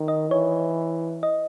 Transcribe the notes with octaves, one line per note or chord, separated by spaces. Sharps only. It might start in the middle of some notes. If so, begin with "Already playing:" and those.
Already playing: D#3
D#5
E3 C#5
D#5